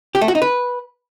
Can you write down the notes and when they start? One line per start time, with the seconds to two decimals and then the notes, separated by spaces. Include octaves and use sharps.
0.15 G4
0.21 A3
0.28 F#4
0.35 D#4
0.42 B4